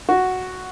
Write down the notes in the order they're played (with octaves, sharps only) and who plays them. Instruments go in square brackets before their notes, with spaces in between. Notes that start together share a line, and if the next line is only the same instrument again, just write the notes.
[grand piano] F#4